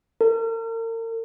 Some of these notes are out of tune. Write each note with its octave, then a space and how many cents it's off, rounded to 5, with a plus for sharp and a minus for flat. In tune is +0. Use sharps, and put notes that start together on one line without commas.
A#4 -40